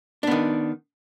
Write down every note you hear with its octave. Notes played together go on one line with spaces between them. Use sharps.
D#3 B3 D4